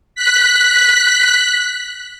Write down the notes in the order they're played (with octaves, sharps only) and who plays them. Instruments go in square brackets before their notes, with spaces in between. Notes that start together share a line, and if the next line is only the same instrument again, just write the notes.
[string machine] F#6 B6